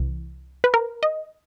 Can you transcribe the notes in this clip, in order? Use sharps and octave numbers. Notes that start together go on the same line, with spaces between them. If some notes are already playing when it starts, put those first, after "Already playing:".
Already playing: C2 C3 E3
B4
A#4
D#5